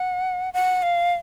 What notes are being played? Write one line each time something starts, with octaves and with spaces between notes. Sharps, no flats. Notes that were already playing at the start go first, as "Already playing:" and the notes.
Already playing: F#5
F#5
F5